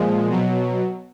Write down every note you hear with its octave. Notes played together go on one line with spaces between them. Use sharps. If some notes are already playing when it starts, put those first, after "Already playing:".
Already playing: A#2 F3 G#3
B2 F#3